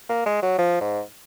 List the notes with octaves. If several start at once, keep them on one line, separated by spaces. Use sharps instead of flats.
A#3
G#3
F#3
F3
G#2